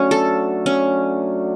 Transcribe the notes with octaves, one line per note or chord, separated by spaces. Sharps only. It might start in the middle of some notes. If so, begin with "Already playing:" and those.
Already playing: F#3 A3 C#4 D4 F#4
A4
C#4